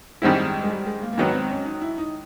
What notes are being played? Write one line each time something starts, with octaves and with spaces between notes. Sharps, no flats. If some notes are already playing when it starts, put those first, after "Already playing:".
G#2 D#3 G3 G#3 C4 E4
G#3
G3
G#3
A#3
A#3
G#2 D#3 F#3 B3
C4
C#4
D#4
E4
D#4